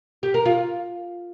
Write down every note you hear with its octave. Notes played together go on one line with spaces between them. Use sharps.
G4
A#4
F4